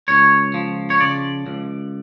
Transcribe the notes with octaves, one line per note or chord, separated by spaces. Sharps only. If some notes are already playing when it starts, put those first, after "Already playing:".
C#2 C#5
F3
C#5
C#3 D5
C#2